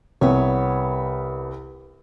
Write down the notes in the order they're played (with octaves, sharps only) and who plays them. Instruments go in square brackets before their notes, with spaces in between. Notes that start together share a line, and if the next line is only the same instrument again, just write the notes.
[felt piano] C2 [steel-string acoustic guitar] B3 C#5